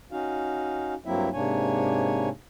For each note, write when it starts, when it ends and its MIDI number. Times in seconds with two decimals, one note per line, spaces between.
0.12 0.94 61
0.12 0.94 63
0.12 0.94 66
0.12 0.94 77
1.06 1.29 43
1.06 1.29 54
1.06 1.29 58
1.06 1.29 60
1.06 1.29 64
1.06 1.29 76
1.33 2.29 44
1.33 2.29 48
1.33 2.29 58
1.33 2.29 62
1.33 2.29 73
1.33 2.29 80